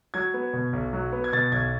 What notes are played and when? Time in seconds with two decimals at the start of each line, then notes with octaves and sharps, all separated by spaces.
0.14 F#3 G#6
0.34 B3
0.53 B2
0.73 B1
0.93 F#3
1.13 B3
1.24 G#6
1.33 B2 A6
1.52 B1 G#6